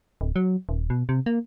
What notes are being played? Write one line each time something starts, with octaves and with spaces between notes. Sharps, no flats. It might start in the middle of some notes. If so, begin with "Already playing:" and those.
D1
F#3
D#1
B2
C3
A#3